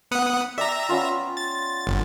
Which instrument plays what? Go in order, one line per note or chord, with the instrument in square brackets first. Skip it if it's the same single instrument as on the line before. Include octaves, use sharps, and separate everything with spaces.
[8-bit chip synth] B3 F#5 D#6
[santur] D5 G5 [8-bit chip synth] E5 A#5
[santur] B3 C#4 F4
[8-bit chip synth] A6
G1